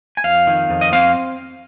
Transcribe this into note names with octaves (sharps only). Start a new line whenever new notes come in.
G#5
F2 F5
D#3
F2
D#5
C4 F5